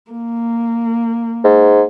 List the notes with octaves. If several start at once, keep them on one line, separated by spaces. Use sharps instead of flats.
A#3
G#2